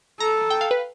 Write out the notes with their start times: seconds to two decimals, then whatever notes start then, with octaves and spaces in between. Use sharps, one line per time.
0.20 A4 A#5
0.50 G5
0.61 F5
0.71 B4